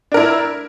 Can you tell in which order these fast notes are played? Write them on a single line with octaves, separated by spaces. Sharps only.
D4 A#4 E4